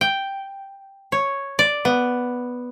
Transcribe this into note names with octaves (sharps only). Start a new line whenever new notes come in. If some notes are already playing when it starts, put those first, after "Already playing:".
G5
C#5
D5
B3